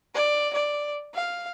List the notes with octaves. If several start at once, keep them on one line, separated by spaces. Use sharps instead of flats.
D5
D5
F5